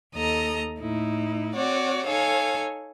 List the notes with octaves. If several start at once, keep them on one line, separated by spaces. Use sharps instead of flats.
D#2 A4 D#5 A#5
A2 D#4 E4
C4 F#4 C#5 D5 F#5
D#4 A4 C#5 F5 G#5